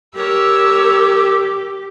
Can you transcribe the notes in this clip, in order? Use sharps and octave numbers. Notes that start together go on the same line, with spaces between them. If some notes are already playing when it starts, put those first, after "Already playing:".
G4 A#4 C#5 E6